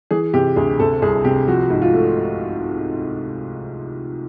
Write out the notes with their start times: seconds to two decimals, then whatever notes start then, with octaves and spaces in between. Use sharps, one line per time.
0.11 E3 G#4
0.34 C3 G4
0.56 D2 G#4
0.79 C3 A4
1.02 C2 G#4
1.24 C3 G4
1.48 F3 F#4
1.70 G#2
1.82 F4
1.93 A3